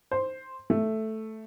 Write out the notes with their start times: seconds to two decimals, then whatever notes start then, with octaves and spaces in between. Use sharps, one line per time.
0.11 C5
0.70 A3